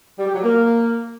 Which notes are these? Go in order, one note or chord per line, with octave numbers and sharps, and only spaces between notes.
G3
G4
F#3
A#3